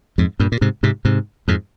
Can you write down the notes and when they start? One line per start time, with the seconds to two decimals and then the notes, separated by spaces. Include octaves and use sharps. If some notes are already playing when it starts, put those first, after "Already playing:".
0.18 F2 G#2
0.40 G2 A#2
0.52 A#2
0.61 G#2 C3
0.83 G#2 C3
1.05 G#2 C3
1.48 F2 G#2